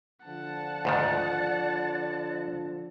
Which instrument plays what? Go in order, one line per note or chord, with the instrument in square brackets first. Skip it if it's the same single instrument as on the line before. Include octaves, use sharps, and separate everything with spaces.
[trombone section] D3 F3 [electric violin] F#5 A5
[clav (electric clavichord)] D2 G#2 D#3 [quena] D5